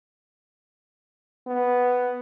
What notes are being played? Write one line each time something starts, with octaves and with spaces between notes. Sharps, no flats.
B3